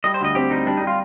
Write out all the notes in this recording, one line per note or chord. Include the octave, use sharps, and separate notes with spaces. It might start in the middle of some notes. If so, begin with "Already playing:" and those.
G3 D#5
C5
D2 D#5
C4 G4
G3 D#4
G3 D4
D#4
G3
F4